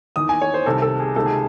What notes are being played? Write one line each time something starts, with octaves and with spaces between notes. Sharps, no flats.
E2 D#3 D#6
G#5
C#5
C5
C2 C3 D#3 A4
A4
G#4
C#2 C3 D#3 A4
G#4